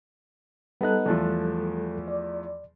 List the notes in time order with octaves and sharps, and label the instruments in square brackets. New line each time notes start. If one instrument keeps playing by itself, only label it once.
[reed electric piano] G3 A4 F#6 [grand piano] B3 D#4
[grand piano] E2 F3 A3
[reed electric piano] D5